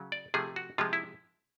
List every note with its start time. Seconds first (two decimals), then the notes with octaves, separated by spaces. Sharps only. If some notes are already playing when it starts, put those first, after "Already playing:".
Already playing: C#3 F#3
0.12 D5
0.34 C3 F3 A3 G#4
0.56 F#4
0.78 C3 F3 G#3 F4
0.93 E4